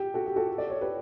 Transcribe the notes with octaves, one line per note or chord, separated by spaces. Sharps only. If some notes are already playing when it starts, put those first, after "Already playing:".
Already playing: G4
F#4 A4
G4
F#4 A4
D5
C#5
G4 B4